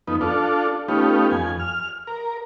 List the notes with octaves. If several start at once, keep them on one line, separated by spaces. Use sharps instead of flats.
F2 B3 D#4
D4 F4 A4
A3 B3 C#4 D#4 F4 G4
F2 G#5
F6
A#4